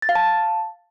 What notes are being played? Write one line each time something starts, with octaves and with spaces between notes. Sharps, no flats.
A6
F5
A5